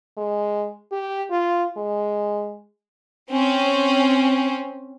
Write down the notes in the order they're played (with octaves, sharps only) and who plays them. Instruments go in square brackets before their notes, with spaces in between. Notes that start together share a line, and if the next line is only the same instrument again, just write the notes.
[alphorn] G#3
G4
F4
G#3
[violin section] C4 C#4